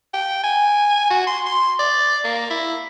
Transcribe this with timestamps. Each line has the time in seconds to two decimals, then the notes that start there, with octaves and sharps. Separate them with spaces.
0.13 G5
0.44 G#5
1.10 F#4
1.27 C6
1.46 C6
1.79 D5
2.24 A#3
2.50 E4